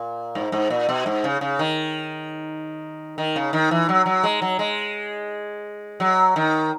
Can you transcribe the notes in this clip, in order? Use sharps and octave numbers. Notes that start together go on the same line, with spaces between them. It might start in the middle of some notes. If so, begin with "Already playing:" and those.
Already playing: A#2
G#2
G#2
A#2
B2
G#2
C#3
C#3
D#3
D#3
C#3
D#3
E3
F#3
F#3
G#3
F#3
G#3
F#3
D#3